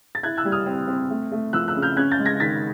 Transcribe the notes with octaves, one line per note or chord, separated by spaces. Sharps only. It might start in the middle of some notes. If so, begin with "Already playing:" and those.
A6
E4 F#6 G#6
E6 F#6
G3
D#6 F6
C4
C4
A3
A3
F3 E6 F#6
E6 F#6
C#3
F6 G6
C#4 F#6 G#6
G6 A6
G#3
G#6 A#6
D#3 A6 B6